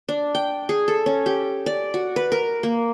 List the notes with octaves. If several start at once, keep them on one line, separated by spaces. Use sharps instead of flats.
D4
G5
G#4
A4
C#4
G4
D5
F#4
B4
A#4
A#3